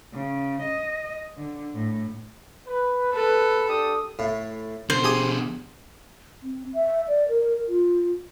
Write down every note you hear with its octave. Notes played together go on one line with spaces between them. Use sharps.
C#3
D#5
D3
A2
B4
A4 B4
D4 G4 D#6
A2
B2 D3 C5
G4 G#4 G#5
C4
E5
D5
A#4
F4